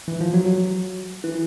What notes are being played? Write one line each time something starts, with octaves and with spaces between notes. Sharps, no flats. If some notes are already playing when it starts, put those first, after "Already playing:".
E3
F3
F#3
F#3
E3